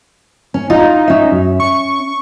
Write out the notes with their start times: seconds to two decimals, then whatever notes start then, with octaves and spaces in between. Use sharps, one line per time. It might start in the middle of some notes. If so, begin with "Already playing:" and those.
0.54 C#4
0.70 D#4 F4
1.08 C#4 E5
1.31 F#2
1.60 C#6